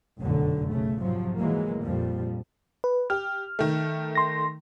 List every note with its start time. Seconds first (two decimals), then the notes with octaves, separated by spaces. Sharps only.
0.21 F1 B1 F#2 A2 D3 F#3
0.71 B1 C#3 A3
1.00 G#2 C3 F3 F#3
1.38 E3 F#3 G#3 A#3
1.84 A#1 F2 F3 G3
2.84 B4
3.10 G4 F6
3.59 D#3 A3
4.15 C6 A#6